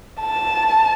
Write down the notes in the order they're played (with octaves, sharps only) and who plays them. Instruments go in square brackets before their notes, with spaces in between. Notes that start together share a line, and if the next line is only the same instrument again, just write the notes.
[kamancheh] A5